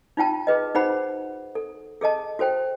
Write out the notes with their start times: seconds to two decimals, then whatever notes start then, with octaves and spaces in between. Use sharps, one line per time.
0.17 D#4 F4 G5 A5
0.47 G#4 B4 D#5
0.75 D#4 F#4 G#4 C5 F#5 B5
1.55 A4
2.01 G#4 A4 D#5 A5
2.39 F#4 A4 C5 G5